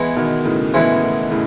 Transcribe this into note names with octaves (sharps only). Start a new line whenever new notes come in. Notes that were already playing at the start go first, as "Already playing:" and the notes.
Already playing: E3 G#3 B3 E4 B4
B2 D#3
A2 C#3
A2 E3 G#3 B3 E4 B4
A2
A2 C#3